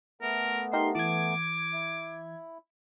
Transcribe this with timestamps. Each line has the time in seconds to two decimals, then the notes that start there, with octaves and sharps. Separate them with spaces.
0.22 A3 B3 A#4
0.73 D#4 G4 A#4 C6
0.95 E3 D6 G#6
1.73 E4